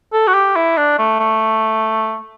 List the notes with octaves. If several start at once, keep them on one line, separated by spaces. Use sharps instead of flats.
A4
F#4
G4
E4
D4
A3
A3